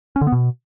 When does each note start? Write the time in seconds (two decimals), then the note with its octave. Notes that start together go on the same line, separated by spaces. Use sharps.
0.16 C#4
0.21 D3
0.27 B3
0.32 B2